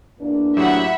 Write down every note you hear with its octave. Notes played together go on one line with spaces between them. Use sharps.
E2 A#3 D4
A2 F#3 G4 E5 F#5 B5